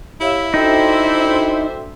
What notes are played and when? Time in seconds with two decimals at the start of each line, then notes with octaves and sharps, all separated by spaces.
0.21 E4 G4 C#5 E5 F5
0.54 D4 D#4 F#4 A4 C5 E5 G5